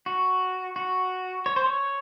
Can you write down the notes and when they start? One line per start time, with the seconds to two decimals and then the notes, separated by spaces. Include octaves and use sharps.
0.06 F#4
0.76 F#4
1.46 C#5
1.56 C5
1.66 C#5